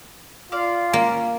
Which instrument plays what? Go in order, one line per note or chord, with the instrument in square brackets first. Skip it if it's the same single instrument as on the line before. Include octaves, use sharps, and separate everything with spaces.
[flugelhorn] F4 [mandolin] D5 F5
[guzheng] A#3 [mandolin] C#4